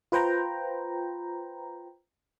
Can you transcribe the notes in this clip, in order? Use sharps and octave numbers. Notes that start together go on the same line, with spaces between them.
F4 B4 C5 G5 A#5